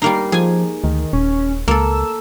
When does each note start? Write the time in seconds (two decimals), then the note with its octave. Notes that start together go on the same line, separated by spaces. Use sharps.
0.02 G3 A#3 D#4 C7
0.32 F3 G#4 G#5
0.84 D2 D#3
1.13 D#1 C#4
1.68 C#2 A#3 A4 E6